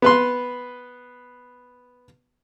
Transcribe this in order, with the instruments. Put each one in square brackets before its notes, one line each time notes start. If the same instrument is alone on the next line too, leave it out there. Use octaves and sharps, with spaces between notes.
[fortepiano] B3 B4 C6